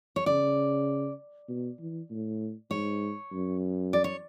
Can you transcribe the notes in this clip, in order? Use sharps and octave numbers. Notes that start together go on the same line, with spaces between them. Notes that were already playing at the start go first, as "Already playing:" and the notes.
C#5
C#3 D5
B2
E3
A2
G#2 C#5
F#2
D5
C#5